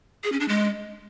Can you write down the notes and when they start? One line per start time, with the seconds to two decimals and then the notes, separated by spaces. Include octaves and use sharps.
0.24 G#4
0.32 C#4
0.40 D4
0.48 G#3